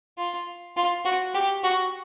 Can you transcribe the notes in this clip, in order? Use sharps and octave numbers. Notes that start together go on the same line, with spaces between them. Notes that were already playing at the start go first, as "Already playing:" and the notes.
F4
F4
F#4
G4
F#4